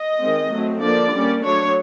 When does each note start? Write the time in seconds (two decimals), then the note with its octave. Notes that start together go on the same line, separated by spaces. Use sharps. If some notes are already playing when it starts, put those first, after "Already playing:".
Already playing: D#5
0.21 D#3 G#3 C4
0.52 F#3 A3 C4
0.83 D3 F3 A#3 D4 D5
1.13 G3 A#3 C#4
1.44 F#3 A3 D4 C#5